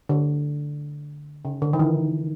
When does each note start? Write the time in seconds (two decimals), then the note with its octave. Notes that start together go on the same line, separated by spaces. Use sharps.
0.09 D3
1.45 C#3
1.62 D3
1.73 D#3
1.79 E3